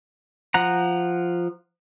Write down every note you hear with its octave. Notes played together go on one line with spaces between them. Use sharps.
F3 F#5 A#5